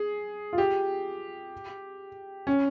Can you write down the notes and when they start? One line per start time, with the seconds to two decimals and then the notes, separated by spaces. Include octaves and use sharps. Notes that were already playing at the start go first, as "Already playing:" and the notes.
Already playing: G#4
0.53 F4
0.58 G4
2.47 C#4